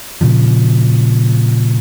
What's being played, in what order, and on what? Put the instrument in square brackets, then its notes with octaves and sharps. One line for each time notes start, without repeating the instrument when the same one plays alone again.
[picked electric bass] A#2 C#3 F3